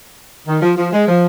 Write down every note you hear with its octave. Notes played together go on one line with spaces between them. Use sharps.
D#3
F3
F3
G#3
F3